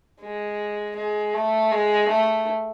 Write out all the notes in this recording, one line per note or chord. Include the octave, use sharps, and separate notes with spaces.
G#3
G#3
A3
G#3
A3